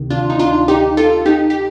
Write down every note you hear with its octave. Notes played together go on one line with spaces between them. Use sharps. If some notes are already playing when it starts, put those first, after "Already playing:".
Already playing: D2 C3 D#3
D4 F4
D#4
D4 F4
D#4 G4
F4 A4
D#4 G4
G4